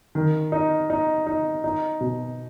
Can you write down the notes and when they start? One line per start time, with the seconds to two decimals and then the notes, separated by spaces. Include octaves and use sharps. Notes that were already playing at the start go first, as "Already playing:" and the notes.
0.15 D#3
0.52 D#4
0.90 D#4
1.27 D#4
1.64 D#4
2.00 B2